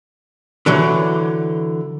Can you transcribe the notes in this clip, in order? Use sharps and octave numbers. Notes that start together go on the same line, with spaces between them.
D3 E3 F#3